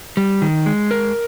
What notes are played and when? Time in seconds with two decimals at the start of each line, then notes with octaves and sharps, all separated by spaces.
0.17 G3
0.42 D#3
0.66 G#3
0.91 A#4